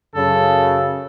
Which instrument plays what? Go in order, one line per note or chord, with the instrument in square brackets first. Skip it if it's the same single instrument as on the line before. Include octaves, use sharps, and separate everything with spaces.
[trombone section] F#2 C#3 [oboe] A4